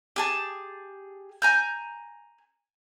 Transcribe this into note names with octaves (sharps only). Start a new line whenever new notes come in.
G4 G#4 A5
G#5 A#5 G6